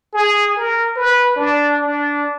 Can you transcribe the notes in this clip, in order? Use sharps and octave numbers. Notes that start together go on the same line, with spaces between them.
G#4
A#4
B4
D4
D4